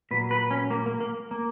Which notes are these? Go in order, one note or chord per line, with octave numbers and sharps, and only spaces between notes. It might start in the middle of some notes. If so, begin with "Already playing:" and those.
A#2 F#3 B4
B4
C#4
A#3
A#3
A#3
A#3